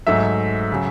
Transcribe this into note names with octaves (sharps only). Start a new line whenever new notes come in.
G#2 F#3 A3 E5
C#3 F#3